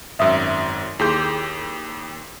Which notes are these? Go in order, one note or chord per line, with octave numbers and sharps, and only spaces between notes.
G#1 F#2 E5 D#6 E6
D#2 E4 G4 G#4 C6 G6